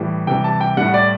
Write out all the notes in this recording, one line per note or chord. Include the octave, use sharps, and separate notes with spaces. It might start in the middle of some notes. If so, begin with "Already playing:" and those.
Already playing: A2 E3 G3
C3 E3 G3 G5
A5
G5
A2 G3 F#5
D5